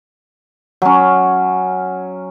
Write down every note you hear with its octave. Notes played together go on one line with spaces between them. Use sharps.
F#3 C#4